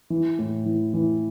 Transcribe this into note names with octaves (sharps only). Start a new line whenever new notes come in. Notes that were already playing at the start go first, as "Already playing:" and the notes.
E3
A2
E3
E3